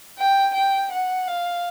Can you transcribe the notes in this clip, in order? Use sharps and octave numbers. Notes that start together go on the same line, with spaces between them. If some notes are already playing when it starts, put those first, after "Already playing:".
G5
G5
F#5
F5